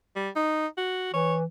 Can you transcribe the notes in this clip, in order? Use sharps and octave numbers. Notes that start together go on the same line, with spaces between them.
G3
D#4
F#4
E3 C#5